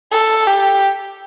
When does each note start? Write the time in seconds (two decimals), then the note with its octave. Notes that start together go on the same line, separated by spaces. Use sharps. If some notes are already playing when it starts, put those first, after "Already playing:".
0.12 A4
0.47 G4